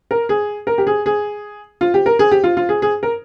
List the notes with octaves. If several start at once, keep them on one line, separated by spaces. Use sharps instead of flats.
A#4
G#4
A#4
G4
G#4
G#4
F4
G4
A#4
G#4
G4
F4
F4
G#4
G#4
A#4